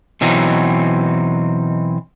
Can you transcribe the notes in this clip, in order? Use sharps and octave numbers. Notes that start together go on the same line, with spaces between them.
B2 E3 F#3 C4 D#4